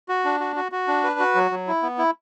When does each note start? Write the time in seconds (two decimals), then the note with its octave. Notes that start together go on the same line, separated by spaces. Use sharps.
0.09 F#4
0.25 D4
0.40 F#4
0.56 F#4
0.72 F#4
0.88 D4
1.03 B4
1.19 F#4
1.35 F#3
1.51 F#3
1.67 E4
1.82 B3
1.98 E4